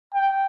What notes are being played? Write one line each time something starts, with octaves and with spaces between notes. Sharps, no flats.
G5